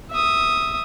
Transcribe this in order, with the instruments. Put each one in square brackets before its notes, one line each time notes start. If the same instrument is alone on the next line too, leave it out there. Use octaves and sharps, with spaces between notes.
[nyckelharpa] E5 D#6